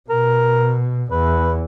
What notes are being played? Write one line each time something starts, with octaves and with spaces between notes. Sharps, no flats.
B2 A#4
E2 B4